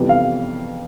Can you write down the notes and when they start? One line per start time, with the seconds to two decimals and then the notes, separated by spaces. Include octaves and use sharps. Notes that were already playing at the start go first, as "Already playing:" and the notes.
Already playing: F2 C3 E3 G3 B3
0.09 F5